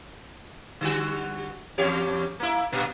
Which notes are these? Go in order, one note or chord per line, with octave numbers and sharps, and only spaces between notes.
D3 G3 F#4
E2 G4 C#5
A#3 E4
G2 A#2